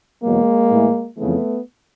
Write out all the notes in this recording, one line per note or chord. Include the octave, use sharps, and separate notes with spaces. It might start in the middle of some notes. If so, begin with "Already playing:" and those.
E2 B2 F#3 G#3 A#3
A2 E3
F2 C#3 E3 A3 B3